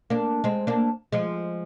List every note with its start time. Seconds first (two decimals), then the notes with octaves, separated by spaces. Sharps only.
0.10 A#3 D4
0.44 G#3 C4
0.67 A#3 D4
1.12 F3 G#3